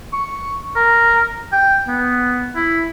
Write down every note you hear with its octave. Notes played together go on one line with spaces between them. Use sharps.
C#6
A#4
G5
B3
E4